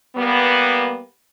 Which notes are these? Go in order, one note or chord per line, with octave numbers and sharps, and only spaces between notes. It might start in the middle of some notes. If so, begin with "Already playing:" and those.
G3 A#3 B3